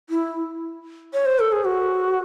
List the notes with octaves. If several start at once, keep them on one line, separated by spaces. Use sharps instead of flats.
E4
C#5
C5
A4
G#4
F#4